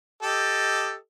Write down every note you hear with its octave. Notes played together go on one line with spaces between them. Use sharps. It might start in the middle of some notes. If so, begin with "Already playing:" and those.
G4 A4 D#5